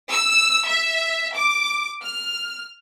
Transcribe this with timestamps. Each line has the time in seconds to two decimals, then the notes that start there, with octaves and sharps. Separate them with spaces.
0.11 E6
0.67 E5
1.36 D6
2.03 F6